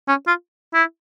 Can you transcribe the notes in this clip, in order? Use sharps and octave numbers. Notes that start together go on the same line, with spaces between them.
C#4
F4
E4